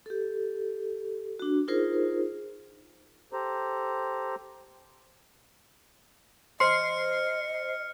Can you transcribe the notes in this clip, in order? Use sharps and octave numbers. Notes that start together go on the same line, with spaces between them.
G4 A4
D4 F#4
D#4 F4 G#4 A#4 C5
G4 A4 C5 A#5
C5 D#5 C6 F6 C7 C#7